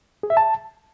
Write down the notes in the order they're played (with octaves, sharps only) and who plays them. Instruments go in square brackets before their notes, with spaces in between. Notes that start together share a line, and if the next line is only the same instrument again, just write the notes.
[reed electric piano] G#4
E5
A5